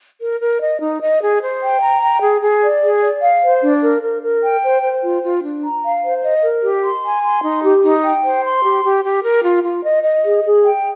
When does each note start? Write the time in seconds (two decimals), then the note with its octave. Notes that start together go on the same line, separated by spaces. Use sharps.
0.21 A#4
0.41 A#4
0.61 D#5
0.81 D#4
1.01 D#5
1.21 G#4
1.42 C5
1.62 G5
1.81 A#5
2.02 G5
2.21 G#4
2.41 G#4
2.62 D5
2.82 G#4
3.02 D5
3.21 F5
3.42 C5
3.62 D4
3.82 A#4
4.02 A#4
4.22 A#4
4.42 G5
4.62 C5
4.82 C5
5.03 F4
5.23 F4
5.42 D4
5.63 A#5
5.83 F5
6.03 C5
6.23 D#5
6.43 A#4
6.62 G4
6.83 C6
7.04 G#5
7.23 C6
7.43 D#4
7.63 G4
7.83 D#4
8.03 G5
8.23 C5
8.43 C6
8.63 G4
8.84 G4
9.03 G4
9.23 A#4
9.44 F4
9.63 F4
9.83 D#5
10.03 D#5
10.23 G#4
10.44 G#4
10.65 G5